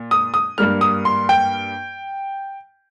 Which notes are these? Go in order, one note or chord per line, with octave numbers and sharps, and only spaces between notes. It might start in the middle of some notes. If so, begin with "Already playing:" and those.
Already playing: A#2
D#6
D#6
G2 G3 A#3 F6
D#6
C6
G5